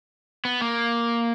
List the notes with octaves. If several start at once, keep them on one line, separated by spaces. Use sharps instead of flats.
B3
A#3